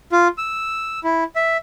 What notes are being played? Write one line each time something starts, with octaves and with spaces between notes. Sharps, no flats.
F4
E6
E4
E5